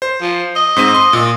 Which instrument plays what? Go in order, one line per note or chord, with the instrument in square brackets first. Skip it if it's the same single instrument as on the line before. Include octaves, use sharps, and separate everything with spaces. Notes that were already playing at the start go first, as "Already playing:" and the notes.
[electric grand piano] C5
[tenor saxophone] F3
D#5
[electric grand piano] G#2 C4 D#7
C6
A#2